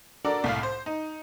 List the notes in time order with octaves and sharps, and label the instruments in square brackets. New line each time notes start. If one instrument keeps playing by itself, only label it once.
[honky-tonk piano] D4 F#4 A4 A#4 D5
C2 A2 F5
C5
D#4